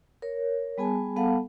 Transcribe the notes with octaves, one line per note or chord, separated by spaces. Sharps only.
A#4 C#5
G3 B3 G#4 G#5 A5
G3 B3 A4 F5 F#5 A5